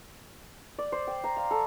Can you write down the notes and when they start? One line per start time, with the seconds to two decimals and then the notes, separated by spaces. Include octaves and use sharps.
0.79 D5
0.92 C5
1.07 G5
1.24 A#5
1.37 F5
1.51 A4